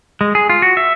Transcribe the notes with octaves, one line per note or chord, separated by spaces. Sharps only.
G#3
G#4
F4
F#4
E5